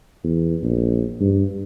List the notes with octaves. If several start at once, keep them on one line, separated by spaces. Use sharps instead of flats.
E2
A#1
G2